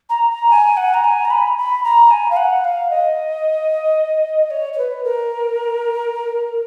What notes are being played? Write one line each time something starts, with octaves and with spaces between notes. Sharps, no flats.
A#5
A#5
G#5
F#5
A#5
G#5
A#5
B5
B5
A#5
G#5
F5
F#5
F5
D#5
C#5
C#5
B4
A#4